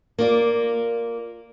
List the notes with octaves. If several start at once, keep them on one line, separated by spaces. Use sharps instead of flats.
A#3 F4 D5